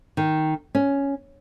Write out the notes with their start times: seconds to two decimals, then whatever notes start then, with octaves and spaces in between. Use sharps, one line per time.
0.17 D#3
0.75 C#4